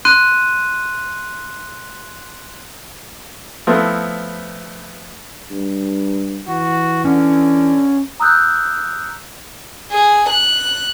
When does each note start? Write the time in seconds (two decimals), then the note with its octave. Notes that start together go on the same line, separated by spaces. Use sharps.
0.05 C6 F#6 D#7
3.67 F3 A3 B3 C4 E4
5.51 G2
6.48 E3 F#4
7.05 D3 C#4
8.20 A#5 D#6 E6 F#6 G6
9.91 G#4
10.28 F#6